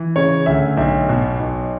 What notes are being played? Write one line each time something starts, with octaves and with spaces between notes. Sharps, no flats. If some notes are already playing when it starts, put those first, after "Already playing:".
Already playing: E3
C#3 C#5
D2 E5
B1 E5
B2
B1